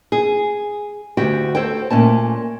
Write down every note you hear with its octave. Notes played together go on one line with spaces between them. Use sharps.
G#4
D2 F#4 G4 G5
A4 C5 C#5 G5
A#2 A3 C#4 A5